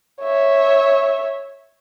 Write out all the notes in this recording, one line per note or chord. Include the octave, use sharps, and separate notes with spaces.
C#5 E5